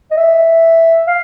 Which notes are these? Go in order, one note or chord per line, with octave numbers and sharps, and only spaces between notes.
D#5
E5
F5